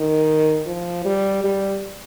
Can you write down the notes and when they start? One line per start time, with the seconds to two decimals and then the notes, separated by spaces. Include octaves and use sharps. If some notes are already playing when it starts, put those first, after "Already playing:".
Already playing: D#3
0.66 F3
1.05 G3
1.44 G3